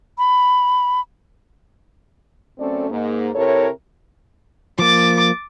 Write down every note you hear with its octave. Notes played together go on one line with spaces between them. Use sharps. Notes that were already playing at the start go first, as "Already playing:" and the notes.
B5
F#2 A3 C4 C#4 A4 D5
G#2 A#3
C3 E4 A4 A#4 C#5
F3 A#3 D6 A6